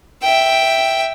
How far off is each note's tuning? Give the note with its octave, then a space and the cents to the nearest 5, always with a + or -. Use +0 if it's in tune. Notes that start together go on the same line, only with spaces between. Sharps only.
E5 +0 G5 +0